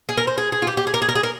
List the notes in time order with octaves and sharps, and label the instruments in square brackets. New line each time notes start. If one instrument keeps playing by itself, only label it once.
[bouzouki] G#4
A#4
C5
G#4
G#4
F4
G4
G4
G#4
A#4
G#4
A#4
G#4
A#4